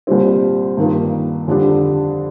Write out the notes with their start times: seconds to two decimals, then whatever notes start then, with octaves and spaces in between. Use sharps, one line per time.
0.07 C2 A#2 G3 C4
0.77 G2 D#3 A#3 F4
1.48 F2 D3 G3 D4